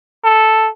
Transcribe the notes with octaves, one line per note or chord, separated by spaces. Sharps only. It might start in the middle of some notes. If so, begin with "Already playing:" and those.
A4